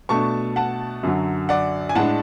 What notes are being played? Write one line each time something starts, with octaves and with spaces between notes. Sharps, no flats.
B2 A3 D4 A5 C#6
F#5 A5
F#2 D3 F#3
D5 F#5
G#5
A2 G#3 D4 F#5 A5